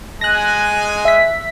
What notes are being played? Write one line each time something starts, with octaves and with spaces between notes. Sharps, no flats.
G#3 G#5 F#6 A#6
E5 B6